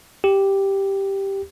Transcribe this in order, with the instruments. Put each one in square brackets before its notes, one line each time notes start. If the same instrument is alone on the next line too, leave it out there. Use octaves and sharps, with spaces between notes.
[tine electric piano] G4